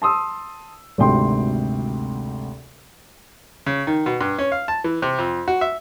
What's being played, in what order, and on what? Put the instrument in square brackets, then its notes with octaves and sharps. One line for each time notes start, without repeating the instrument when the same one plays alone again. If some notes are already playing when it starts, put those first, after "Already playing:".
[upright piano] A5 C6 D#6 E6
G#1 D2 C3 G5 C6
[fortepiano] C#3
D#3
B2
G2
C#4
F5
A5
E3
C3
F2
F#4
E5